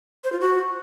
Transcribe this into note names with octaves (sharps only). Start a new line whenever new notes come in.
C5
F4
F#4